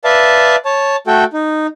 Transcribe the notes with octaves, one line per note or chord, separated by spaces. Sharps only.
B4 D5 E5 F5 A5
C#5 A5
A3 F#4 A4 G5
D#4